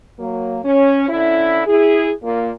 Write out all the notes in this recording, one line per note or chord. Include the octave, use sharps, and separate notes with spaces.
F#3 A#3
C#4
D3 C#4 E4
E4 G#4
A#2 A#3